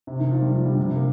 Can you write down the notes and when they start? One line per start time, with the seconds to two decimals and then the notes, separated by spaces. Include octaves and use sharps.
0.07 C3
0.20 D#3
0.31 F3
0.42 G3
0.55 F3
0.66 G3
0.71 D3
0.77 C3
0.96 A#3